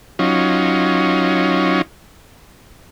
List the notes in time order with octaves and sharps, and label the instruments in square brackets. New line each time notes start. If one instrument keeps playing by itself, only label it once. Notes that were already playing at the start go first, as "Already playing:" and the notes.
[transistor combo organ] F#3 C#4 D#4 F4